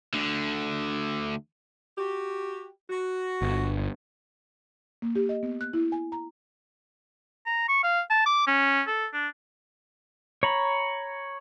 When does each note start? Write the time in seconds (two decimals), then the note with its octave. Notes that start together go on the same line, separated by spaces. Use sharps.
0.14 D2 D3
1.97 F#4 G4
2.90 F#4
3.42 G1
5.02 A#3
5.15 G4
5.29 D#5
5.43 B3
5.61 F#6
5.73 E4
5.92 G#5
6.12 A#5
7.46 A#5
7.68 C#6
7.83 F5
8.10 A5
8.26 D6
8.47 C#4
8.87 A4
9.13 D4
10.43 C#5 A#5 B5